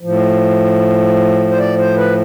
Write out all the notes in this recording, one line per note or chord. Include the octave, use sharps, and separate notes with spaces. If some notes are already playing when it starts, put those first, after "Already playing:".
A2 F3
C5
D5
C5
B4